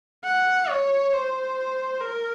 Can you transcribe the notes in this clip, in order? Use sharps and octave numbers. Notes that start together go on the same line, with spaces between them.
F#5
C#5
C5
A#4